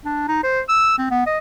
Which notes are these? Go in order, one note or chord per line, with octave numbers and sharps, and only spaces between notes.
D4
D#4
C5
E6
C4
B3
D#5